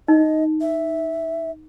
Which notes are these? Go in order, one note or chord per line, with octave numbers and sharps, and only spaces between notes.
D#4 D#5
E5